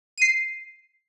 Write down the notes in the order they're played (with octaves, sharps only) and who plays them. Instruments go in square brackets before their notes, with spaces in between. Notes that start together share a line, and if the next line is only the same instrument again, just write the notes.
[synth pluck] C7 D#7